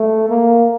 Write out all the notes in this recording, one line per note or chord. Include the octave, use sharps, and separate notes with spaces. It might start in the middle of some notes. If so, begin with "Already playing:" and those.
Already playing: A3
A#3